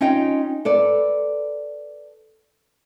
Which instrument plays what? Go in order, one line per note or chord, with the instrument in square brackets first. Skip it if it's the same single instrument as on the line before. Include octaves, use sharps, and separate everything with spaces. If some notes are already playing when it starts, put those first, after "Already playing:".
[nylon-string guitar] C#4 D#4 F4 D#5 G5
A4 B4 D5